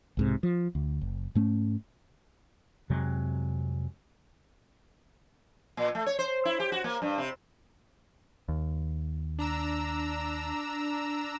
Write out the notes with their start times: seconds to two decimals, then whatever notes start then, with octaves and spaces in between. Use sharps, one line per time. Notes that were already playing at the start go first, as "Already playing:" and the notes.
0.17 B1 G#2 C3
0.43 F3
0.75 D2
1.01 F#1
1.35 G#2 A3 C#4
2.90 F2 C3 F#3 G#3
5.77 A#2
5.95 A3
6.06 C#5
6.19 C5
6.45 E4
6.60 G4
6.72 F#4
6.84 A#3
7.02 G2
7.18 C3
8.48 D#2
9.39 D4 A#5 E6